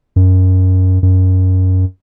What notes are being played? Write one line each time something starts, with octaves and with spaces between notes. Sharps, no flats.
F#2
F#2